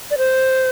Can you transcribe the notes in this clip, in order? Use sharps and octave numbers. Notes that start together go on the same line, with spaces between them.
D5
C5